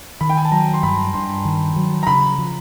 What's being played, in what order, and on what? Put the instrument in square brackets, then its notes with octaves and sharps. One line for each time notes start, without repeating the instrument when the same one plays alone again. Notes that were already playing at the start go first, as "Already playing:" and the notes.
[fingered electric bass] D#3 [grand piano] B5
[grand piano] G5
G#5
A5
[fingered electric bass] F#3 [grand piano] A#5
[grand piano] C6
[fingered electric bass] G2 [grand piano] B5
[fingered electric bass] G2 [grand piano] C6
[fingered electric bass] D#3
F#3
[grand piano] A#5
[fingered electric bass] C#3 [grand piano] B5
[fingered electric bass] F3